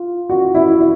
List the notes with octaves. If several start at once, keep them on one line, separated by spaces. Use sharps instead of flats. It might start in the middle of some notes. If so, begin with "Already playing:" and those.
Already playing: F4
F#4
E4
E4